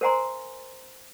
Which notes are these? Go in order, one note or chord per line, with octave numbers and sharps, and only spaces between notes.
A#4 C5 F#5 G#5 A#5 C6